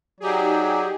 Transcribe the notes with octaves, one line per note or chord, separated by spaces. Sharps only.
F#3 D#4 G4 G#4 D5